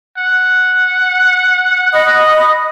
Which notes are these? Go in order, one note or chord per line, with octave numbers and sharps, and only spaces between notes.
F#5
D#5 B5 D#6